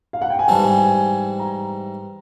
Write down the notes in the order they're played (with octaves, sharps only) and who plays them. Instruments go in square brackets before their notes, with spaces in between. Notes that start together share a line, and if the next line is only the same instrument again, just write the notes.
[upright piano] F5
F#5
G5
G#5
[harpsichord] G#2 E3 G3 C4 [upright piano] A5
[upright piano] G#5
G#5
A#5